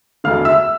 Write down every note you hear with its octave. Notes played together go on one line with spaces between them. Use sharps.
E1 D2 D3 F5 F6
E5 E6